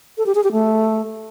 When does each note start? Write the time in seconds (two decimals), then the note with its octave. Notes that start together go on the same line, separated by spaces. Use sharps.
0.18 A4
0.26 G4
0.35 G#4
0.44 G4
0.52 A3